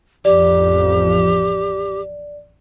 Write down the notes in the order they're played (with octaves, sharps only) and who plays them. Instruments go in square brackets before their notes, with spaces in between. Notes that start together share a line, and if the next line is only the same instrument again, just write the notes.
[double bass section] A1 F2 F3 [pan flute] G4 [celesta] D5